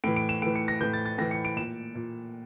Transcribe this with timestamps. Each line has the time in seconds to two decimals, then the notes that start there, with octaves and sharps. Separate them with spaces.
0.04 A2 E3 D7
0.16 D7
0.29 E7
0.42 A2 E3 D7
0.55 C#7
0.68 A#6
0.81 E3 G6
0.83 A2
0.93 A6
1.06 A6
1.18 A2 E3 A#6
1.31 C#7
1.45 D7
1.57 A#2 E7
1.95 A#2